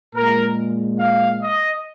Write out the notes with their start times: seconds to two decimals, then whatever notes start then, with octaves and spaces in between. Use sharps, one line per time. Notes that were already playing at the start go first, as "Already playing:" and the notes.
0.15 A#2 G#3 A#4
0.99 F5
1.42 D#5